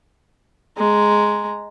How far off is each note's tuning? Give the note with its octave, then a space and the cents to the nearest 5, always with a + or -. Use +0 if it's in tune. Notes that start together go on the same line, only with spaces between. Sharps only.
G#3 +5 A#5 +0